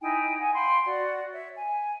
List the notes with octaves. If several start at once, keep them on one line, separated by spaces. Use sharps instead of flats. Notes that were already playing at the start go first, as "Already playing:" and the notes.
D#4 E4 G5 G#5
F#5 G#5
F5 G5 B5 C6
F#4 D5 F#5
C#5 E5
G#5